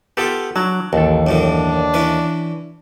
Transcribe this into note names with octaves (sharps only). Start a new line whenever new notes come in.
B3 F4 G4 A4
F#3 D4
A1 D#2 A4
F#2 A2 E3 D4
E3 C#4 B4